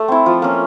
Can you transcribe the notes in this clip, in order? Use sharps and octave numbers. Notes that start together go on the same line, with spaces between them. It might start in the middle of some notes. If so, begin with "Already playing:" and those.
Already playing: A3
C4 E4
F3
A#3 C#4